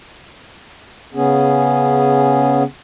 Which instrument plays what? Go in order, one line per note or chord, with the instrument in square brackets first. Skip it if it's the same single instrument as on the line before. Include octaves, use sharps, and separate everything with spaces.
[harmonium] C#3 B3 C#4 G#4